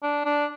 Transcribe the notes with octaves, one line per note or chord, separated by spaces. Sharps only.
D4
D4